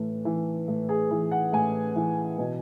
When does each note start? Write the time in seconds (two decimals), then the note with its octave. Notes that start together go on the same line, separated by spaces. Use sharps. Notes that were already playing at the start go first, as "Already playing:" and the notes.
Already playing: A2 E3
0.25 E3
0.68 A2
0.89 G#4
1.11 E3
1.31 F#5
1.52 A2 G#5
1.96 E3
2.38 B2